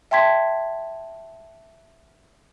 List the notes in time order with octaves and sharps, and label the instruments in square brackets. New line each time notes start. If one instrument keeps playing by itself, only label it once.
[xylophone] E5 G5 A5 C6 G#6 B6